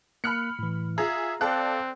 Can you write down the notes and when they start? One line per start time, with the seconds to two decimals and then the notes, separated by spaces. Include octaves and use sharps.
0.24 A#3 B5 F6 F#6 C#7
0.59 A2 E3
0.98 F4 G#4 E5 A#5
1.41 C4 A4 D5 F5 G5 D6 F#6